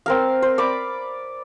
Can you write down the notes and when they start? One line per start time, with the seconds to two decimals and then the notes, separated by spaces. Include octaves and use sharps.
0.06 C4 A#4 F5
0.42 C5
0.58 D5 B5 D6